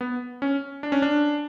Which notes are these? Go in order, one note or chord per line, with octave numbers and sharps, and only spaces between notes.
B3
C#4
D4
C#4
D4